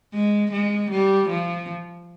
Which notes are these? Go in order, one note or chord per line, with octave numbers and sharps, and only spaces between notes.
G#3
G#3
G3
F3